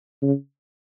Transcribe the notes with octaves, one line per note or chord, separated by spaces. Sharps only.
C#3